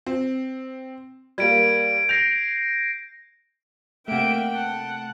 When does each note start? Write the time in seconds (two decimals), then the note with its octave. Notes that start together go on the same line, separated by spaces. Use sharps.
0.06 C4
1.38 G3 A#3 G#6 D7
2.09 G6 A#6 C7 F7
4.08 C3 A3 A#3 E5 F#5 G5 D7
4.55 F#5 A5